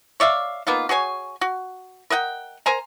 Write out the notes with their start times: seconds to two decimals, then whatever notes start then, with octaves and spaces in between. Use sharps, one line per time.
0.20 C#5 D5 E5 F5
0.67 A#3 B3 D#4 F4
0.89 F#4 G#4 C#5 G#5
1.41 F#4
2.10 A#4 D#5 F#5 G5
2.66 A#4 C5 G#5 A#5